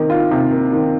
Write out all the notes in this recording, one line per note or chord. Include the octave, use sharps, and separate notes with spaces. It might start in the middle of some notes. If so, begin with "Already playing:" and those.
Already playing: C3 D#3 A#3
F4
C3
A#3
D#3